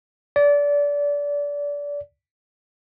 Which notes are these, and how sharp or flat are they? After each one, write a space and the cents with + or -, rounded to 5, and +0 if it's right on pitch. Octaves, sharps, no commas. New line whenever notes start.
D5 -25